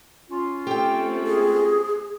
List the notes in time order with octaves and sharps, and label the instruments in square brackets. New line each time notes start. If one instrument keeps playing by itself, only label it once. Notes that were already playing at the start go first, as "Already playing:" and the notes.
[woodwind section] C#4 F4
[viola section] A3 C4 A4 [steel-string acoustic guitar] G4 G5
[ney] G#4